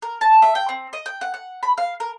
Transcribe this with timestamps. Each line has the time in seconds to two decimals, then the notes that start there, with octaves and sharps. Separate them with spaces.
0.02 A#4
0.21 A5
0.42 E5
0.55 G5
0.69 C4
0.93 D#5
1.06 G5
1.21 F#5
1.34 F#5
1.63 B5
1.78 F5
2.00 A#4